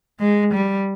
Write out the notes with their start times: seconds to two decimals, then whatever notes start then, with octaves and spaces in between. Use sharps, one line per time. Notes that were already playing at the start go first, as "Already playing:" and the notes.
0.20 G#3
0.53 G3